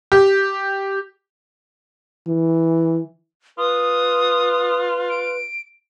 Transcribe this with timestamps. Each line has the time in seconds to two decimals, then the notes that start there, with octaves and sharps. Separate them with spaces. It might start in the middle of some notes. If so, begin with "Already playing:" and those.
0.12 G4
2.28 E3
3.58 F4 B4 D#6
5.10 D7